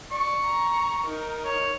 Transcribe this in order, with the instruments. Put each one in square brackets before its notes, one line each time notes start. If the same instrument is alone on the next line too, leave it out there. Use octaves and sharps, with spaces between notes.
[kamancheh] D5 [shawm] C#6
[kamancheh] A#5
D#4 A#4
[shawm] C#5